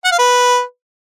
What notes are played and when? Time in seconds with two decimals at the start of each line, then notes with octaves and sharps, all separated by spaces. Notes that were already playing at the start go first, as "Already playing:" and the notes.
0.05 F#5
0.12 F5
0.19 B4